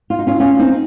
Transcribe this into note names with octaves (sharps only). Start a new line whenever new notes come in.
F4
D#4
C#4 F4
C#4 F4
C4 D#4